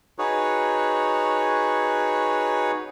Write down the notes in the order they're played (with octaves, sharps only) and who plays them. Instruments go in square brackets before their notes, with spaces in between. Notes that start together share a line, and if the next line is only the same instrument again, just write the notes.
[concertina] D#4 F#4 G#4 B4 C#5